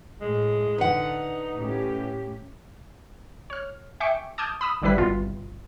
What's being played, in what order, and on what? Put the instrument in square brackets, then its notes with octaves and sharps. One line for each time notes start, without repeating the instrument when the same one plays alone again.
[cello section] A2 [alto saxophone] G#3
[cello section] D3 [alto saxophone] D#4 [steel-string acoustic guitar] B4 F#5
[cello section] A2 C#4 G4
[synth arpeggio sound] C#5 F6
E5 G5 G#5 C#6 D6 C#7
A5 D6 D#6 F6 G6 G#6
B5 D#6 E6
G#1 D3 G3 E4 B4 B6
G1 C2 B2 F4